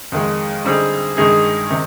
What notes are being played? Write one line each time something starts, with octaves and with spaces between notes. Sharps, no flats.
F2 D#3 G#3
D3 G3 C4 D#4 G#4
G2 D#3 G#3 D#4 G#4
C3 D#3